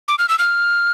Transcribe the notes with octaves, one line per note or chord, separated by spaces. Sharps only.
D6
F6
E6
F6